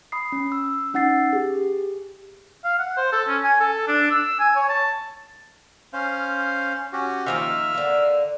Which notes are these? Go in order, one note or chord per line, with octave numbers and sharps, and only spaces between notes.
B5 D#6 C7
C#4
E6
C#4 D#4 F#5 E6 A6 C7
G4 G#4
F5
F#5
C5
A4
C#4
G#5
A4
D4
E6
G#5
C#5
A5
C#4 C5 F5
C#4 F#4 G4
D#3 F3 A#3 E5 F6
D3 A#3